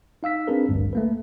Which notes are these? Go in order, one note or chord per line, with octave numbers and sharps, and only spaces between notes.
D#4 F5 E6 B6
C4 D4 G#4 A#4 B4
A1 D2 G2
A3 A#3 B4